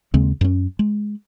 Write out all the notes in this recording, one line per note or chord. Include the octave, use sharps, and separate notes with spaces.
D#2 C#3 G#3 C4
F#2 C#4
G#3